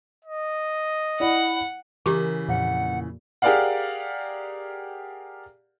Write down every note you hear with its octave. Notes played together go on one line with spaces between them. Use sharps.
D#5
E4 D5 F#5
C#3 E3 G4 A#4 D6
F2 A#2 F#5
G4 G#4 A#4 D5 F5 F#5